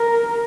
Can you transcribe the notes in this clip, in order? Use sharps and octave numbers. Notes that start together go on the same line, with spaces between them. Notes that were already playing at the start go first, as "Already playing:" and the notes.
Already playing: A#4